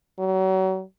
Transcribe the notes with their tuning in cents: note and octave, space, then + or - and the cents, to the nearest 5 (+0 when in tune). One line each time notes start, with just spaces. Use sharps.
F#3 +35